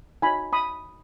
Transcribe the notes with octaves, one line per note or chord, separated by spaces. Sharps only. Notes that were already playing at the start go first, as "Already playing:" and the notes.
D#4 F#4 C#5 G#5 B5
B5 D#6